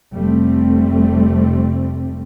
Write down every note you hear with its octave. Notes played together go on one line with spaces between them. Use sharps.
F1 G3 A3 C4